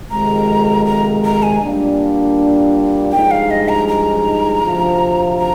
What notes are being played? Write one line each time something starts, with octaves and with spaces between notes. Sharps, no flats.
F2 C3 D#3 G#3 A#5
A#5
A#5
G#5
A#2 G3 A#3 D4
G2 F3 G#3 D#4 G5
F5
D#5
A#5
A#5
D2 C3 F3
A#5